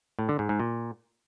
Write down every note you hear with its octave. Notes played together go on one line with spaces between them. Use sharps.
A2
D3
G#2
G#2
A#2